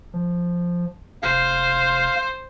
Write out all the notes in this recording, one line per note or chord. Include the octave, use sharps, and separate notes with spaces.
F3
F1 C5 F5